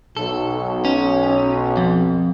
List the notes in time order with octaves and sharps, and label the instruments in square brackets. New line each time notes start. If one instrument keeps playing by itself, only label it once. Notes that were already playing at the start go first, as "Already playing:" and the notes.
[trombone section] B1 [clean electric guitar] A4
[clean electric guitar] C#4
F2